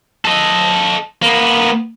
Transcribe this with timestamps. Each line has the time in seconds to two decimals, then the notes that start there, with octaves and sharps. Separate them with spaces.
0.25 A4 D#5
1.22 A#3 B3